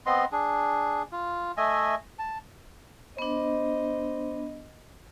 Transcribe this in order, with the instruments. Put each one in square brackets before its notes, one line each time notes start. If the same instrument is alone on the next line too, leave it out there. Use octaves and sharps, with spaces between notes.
[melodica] B3 C4 D#5 C6
D4 G#4
F4
A3 D#5 E5 G#5
A5
[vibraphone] B3 D4 [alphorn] C5 [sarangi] D#5